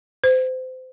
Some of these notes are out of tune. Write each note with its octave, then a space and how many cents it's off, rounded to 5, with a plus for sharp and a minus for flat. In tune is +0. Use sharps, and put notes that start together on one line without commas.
C5 -30